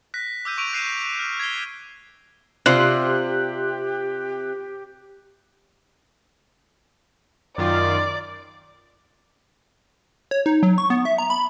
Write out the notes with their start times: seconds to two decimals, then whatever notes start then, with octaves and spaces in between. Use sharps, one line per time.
0.14 F#6 A#6 B6
0.45 D6 E6 G6 D#7
0.58 C#6 D7 D#7 F7
0.73 F#6 A#6 C7 D#7 E7
1.19 F6
1.40 G#6 B6 C7 G7
2.66 C3 F4 G4 C5 D5 F#6
7.58 F#2 D#3 F4 D5
10.31 C#5
10.46 D#4
10.63 F#3
10.78 C#6
10.90 B3
11.05 E5
11.18 A#5
11.30 B5